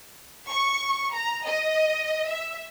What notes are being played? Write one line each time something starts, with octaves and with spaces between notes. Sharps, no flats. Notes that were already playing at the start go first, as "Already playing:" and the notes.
C#6
A#5
D#5
E5